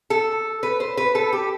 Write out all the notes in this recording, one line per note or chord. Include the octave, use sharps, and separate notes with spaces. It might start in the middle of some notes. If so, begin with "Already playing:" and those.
A4
B4
C5
B4
A4
G4